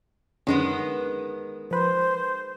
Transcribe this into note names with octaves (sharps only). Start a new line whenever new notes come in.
F#2 D3 D#3 G#3 B3 C#4
F3 B4 C5